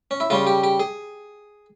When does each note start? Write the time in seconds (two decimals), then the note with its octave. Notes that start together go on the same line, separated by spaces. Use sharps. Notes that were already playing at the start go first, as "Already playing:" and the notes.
0.11 C#4
0.20 E4
0.30 C#3 G3 C#4 F4
0.47 G4
0.63 G4
0.80 G#4